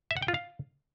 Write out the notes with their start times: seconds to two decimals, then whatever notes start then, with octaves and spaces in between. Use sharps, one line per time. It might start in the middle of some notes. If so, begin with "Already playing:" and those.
0.11 E5
0.17 F#5
0.22 G5
0.28 F4
0.34 F5